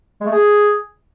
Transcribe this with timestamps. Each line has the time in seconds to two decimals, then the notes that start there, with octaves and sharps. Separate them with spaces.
0.21 G#3
0.26 A3
0.32 G#4